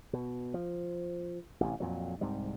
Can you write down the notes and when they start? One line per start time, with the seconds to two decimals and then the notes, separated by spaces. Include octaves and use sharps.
0.13 B2
0.54 F3
1.61 A1 C3
1.80 F2 A#2 F#3
2.21 C2 G#2 C3 G3